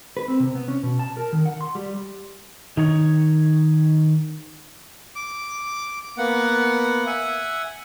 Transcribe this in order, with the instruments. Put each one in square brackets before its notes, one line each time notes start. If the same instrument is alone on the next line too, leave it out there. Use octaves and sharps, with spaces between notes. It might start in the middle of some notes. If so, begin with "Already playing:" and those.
[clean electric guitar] B4
C4
C3
B3
C#4
B2
A5
A#4
D#3
F#5
C6
G3
[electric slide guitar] D#3 D#4 C#5
[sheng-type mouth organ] D6
A#3 B3 F#5
E5 F#5 G#5